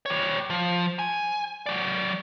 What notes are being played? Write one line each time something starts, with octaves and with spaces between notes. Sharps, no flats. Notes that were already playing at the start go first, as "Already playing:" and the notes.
G3 C#5
F3
G#5
F#3 D5